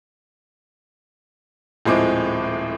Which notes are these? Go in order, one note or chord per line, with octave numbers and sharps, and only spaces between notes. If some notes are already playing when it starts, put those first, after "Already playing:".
D#1 A2 F3 G#3 C4 D6